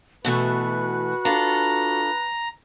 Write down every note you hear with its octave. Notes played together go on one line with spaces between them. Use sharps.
B2 E3 A3 F#4 B4
D4 F4 A4 A#5